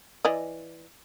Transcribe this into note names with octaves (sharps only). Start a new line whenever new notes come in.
E3 D5 D#5